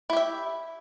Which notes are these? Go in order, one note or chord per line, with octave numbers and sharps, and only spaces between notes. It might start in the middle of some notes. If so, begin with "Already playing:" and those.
E4 G4 E5